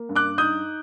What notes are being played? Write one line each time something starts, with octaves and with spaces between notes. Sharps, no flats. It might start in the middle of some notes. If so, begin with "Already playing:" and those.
Already playing: A#3
G2
D6 F#6
D#4 D#6 G6